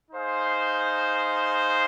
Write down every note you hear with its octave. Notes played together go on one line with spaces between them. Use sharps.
D#4 G#4 C5 F5